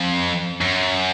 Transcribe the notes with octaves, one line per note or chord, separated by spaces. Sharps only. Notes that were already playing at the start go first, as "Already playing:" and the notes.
Already playing: F2
F#2